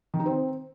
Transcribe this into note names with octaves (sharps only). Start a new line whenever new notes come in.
D#3
D#4
C4